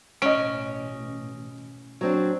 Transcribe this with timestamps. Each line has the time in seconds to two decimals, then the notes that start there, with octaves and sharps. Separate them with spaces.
0.22 A1 B2 C#4 D#5 D7
2.01 F#3 C4 D4